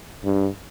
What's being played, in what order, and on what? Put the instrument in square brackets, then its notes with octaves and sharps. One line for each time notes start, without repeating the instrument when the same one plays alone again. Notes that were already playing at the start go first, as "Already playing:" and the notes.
[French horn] G2